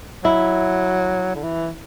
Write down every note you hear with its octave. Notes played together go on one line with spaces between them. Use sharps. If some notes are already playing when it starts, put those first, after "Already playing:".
F#3 E4
D3
E3